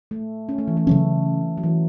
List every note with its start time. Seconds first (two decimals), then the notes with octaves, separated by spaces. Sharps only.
0.11 A3
0.49 C#4
0.58 A3
0.67 E3
0.77 A3
0.87 C#3 F#3 C#4
1.57 F#3
1.63 E3